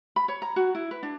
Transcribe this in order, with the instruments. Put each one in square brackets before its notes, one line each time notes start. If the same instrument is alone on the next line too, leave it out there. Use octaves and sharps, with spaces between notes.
[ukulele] B5
C#5
A#5
F#4
E4
B4
D4